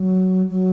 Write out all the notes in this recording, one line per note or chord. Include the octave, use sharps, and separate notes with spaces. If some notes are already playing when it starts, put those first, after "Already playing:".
Already playing: F#3
F#3